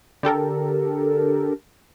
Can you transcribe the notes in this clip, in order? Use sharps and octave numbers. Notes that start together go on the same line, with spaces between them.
D3 G4 A4 A#4